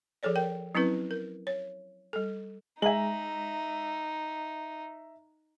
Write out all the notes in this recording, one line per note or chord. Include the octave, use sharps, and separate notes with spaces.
F3 G#4 A4 C#5 D5
A#4 G5
F#3 C4 C#4 E4 B4
A#4
C#5
G3 A4
G#3 D#4 E5 G#5 A#5 F#7